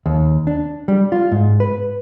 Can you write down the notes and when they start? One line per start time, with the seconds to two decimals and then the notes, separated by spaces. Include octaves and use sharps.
0.06 D#2
0.47 D4
0.88 G3
1.12 F4
1.32 G#2
1.60 B4